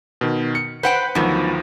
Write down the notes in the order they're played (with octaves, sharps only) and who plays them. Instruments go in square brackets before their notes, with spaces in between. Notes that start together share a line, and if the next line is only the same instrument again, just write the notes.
[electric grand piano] B2 D#3
C#7
[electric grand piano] B4 B5 [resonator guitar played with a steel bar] C5 F#5 G5
[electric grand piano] D2 D#3 F3 [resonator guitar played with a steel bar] F#3 B3